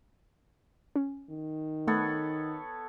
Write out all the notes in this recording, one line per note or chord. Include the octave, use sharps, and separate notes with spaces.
C#4
D#3
A3 B3 A4 C#5